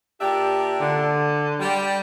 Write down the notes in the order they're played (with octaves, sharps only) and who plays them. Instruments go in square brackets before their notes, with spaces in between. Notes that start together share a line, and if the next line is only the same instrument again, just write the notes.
[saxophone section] A#2 D4 E5 [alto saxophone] G4
[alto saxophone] D3
[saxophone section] G3